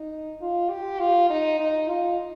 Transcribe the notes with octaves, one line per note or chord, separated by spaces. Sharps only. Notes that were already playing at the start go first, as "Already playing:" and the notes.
Already playing: D#4
F4
G4
F4
D#4
D#4
F4